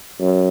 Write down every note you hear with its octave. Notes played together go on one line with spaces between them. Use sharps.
F#2